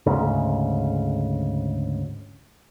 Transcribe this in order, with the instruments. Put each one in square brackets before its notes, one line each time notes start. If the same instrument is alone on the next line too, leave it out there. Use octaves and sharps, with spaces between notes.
[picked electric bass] D2 G#2 C#3